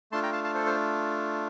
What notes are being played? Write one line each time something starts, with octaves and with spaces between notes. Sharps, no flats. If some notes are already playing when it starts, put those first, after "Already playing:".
A3 D4 F4 A5 C6
G5 A#5
F5 A5
F5 A5
A4 C5
C5